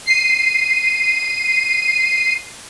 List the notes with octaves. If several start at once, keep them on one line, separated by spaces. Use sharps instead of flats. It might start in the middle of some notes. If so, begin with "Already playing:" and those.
C7 D#7